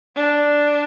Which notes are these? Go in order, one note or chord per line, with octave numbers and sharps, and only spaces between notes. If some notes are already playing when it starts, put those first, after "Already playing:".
D4